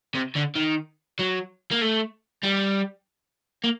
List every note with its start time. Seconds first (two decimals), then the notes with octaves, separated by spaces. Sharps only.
0.15 C3
0.36 D3
0.56 D#3
1.19 F#3
1.71 A#3
1.81 A3
2.44 G3
3.64 A#3